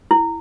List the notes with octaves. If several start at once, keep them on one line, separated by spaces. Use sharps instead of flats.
E4